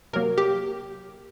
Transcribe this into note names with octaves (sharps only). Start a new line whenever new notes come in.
C3 F#3 A#3 A#4
G4